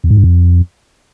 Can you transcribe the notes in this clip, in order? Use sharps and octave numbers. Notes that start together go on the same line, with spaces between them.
E2
G#2
G2
F2